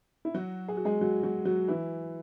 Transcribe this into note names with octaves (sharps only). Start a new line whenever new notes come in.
E4
F#3 F#4
G#4
F#4
G#3 G#4
F#3 F#4
F#3 F#4
F#3 F#4
E3 E4